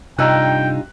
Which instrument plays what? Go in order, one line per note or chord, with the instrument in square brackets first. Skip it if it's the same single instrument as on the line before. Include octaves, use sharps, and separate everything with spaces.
[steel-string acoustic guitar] G2 D#4 F4 [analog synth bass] C3 [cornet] G5 [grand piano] A#5 E6 F#6